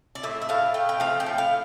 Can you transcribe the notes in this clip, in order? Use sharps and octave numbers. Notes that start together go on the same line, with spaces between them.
D5
A2 E5
E5
A2 F5
A3 G5
G5
F3 F5
G5
A2
F5